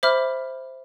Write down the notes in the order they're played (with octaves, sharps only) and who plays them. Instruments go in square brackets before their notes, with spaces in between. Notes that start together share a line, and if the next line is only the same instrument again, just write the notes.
[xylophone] C5 E5 B5 D6 F6